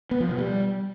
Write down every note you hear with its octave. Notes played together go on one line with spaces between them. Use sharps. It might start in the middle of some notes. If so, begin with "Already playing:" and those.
B3
F3
B2
G3